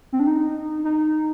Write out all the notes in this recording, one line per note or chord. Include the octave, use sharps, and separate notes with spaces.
C4
D4
D#4
D#4